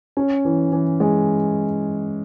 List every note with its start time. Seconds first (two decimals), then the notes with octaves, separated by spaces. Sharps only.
0.17 C#4
0.45 E3
0.72 E3
1.00 G#3